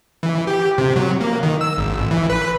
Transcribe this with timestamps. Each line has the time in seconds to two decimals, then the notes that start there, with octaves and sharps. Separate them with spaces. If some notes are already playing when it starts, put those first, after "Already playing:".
0.23 E3
0.47 G4
0.78 C3
0.96 F#3
1.21 A#3
1.43 D#3
1.61 E6
1.78 G#1
1.98 A1
2.11 E3
2.30 B4